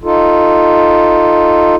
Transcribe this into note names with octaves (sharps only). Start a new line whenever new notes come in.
D#4 F4 A4